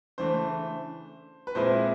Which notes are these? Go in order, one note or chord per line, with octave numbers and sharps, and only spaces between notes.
C#3 E3 A3 D4 C5
B4
A#2 F3 G#3 C4 E4 C5